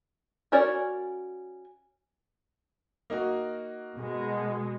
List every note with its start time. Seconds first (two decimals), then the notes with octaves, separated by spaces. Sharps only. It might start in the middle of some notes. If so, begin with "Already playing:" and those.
0.52 C#4 F#4 A#4 C#5 D5
3.10 A#3 D#4 F#4
3.97 B2 G#3